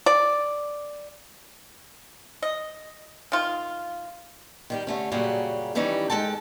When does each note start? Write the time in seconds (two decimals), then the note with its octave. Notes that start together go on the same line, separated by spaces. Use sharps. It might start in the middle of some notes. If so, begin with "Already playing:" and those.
0.06 D5
2.42 D#5
3.32 D#3 F4
4.70 D#3 G3 G4
4.87 D3 A3 C#4
5.12 F#2 A#2 C#3 F#3 G3
5.75 D#3 E3 G3 C#4 D#4
6.10 G#3 D#4 A4 G5 A5